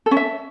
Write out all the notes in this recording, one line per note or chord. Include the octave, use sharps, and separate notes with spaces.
A4
C#4
E5